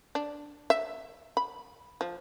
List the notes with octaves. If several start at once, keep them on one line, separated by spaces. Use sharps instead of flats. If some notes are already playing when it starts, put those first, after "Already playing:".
D4
E5
B5
F3